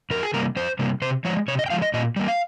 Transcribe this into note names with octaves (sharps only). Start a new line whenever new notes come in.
F2 A#4
G#4
C3 G3 A#3 A#4
F2 C5
C3 G3 A#3
C3 C5
F3 G#3 C#5
C3 C#5
D#5
G5
F3 G#3 F5
D#5
A#2 D#5
G3 A#3
F5